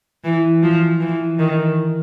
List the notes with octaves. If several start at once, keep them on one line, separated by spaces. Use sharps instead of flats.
E3
F3
E3
D#3